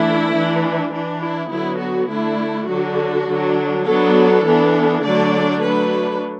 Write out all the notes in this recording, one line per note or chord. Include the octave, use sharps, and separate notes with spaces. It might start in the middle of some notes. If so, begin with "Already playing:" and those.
Already playing: E3 A3 D4 E4
E3 D4
E3 D4
E4
D3 F#3 B3 E4
F#4
D3 A3 D4 E4
D3 F#3 D4 F#4
D3 F#3 D4
F#3 B3 D4 A4
E3 B3 D4
D3 F#3 A3 D4 D5
F#3 A3 D4 B4